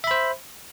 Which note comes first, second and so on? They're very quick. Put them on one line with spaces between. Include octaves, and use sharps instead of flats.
E5 B5 C5